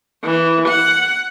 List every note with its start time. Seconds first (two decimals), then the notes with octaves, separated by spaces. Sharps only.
0.24 E3
0.68 F#5